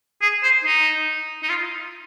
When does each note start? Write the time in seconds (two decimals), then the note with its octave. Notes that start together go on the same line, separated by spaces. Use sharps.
0.22 G#4
0.43 C5
0.65 D#4
1.43 D#4
1.49 F4